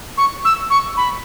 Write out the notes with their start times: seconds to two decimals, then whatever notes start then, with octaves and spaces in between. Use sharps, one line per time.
0.17 C#6
0.45 E6
0.70 C#6
0.97 B5